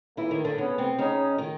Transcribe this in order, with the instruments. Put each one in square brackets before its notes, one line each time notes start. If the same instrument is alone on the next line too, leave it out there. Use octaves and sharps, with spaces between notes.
[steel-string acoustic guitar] E3 E4 [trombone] A#3
[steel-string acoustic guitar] D#3 D#4
D3 D4
[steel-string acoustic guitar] C#3 C#4 [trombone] B3
[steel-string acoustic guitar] C3 C4
[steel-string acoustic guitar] C#3 C#4 [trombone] D#4
[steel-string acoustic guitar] D#3 D#4